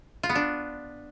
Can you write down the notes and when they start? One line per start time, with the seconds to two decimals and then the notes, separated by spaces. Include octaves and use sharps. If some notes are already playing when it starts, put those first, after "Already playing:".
0.23 F4
0.29 B3
0.35 D4